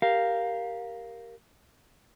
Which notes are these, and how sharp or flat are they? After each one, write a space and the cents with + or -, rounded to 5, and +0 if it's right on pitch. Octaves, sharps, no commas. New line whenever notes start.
G4 +0 A#4 +0 F5 +0